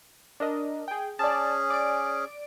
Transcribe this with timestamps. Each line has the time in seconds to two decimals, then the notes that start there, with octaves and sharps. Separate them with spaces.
0.40 D4 A#4 D#5
0.88 G#4 G5
1.19 C#4 G#4 D5 A5
1.70 D5 D7